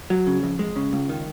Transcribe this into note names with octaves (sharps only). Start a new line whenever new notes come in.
F#3
C#3
F2
G#3
C#3
C#2
D#3